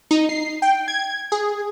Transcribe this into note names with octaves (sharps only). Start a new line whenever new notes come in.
D#4
C7
G5
G#6
G#4